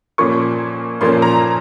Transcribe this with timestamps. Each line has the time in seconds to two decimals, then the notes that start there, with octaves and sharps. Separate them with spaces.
0.18 A#2 F3 A#3 C#4 F4 C#6
1.01 A#2 F3 A#3 C#4 F4 C6
1.22 A#5